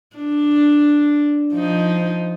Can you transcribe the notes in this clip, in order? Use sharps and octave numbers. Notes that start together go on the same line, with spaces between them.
D4
F3 D#4